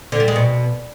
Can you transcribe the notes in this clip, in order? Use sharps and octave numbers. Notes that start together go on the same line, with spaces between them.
D3
G3
G#3
B2